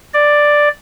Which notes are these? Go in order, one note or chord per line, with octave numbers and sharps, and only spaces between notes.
D5